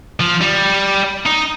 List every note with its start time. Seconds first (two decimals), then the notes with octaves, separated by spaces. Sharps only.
0.20 F3
0.41 G3
1.26 D#4